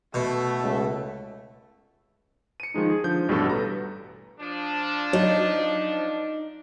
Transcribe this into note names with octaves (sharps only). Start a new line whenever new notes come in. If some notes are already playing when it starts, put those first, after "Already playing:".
B2 A3
C#2
C#7 D#7
D#3 F3 G#3 D#4
G#4
D3 F3 G6
A1 G2 B2 G3 F#4 A4
B4 A#5
F3 D4
F#3 D#4